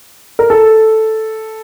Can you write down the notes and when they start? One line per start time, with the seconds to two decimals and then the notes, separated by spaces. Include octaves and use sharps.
0.39 A#4
0.50 A4